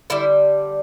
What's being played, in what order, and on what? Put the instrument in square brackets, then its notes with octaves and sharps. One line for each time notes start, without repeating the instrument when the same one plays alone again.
[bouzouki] D3 G3 E4